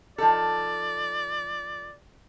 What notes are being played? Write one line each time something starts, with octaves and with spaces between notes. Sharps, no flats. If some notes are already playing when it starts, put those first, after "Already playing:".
F3 D#4 A4 D5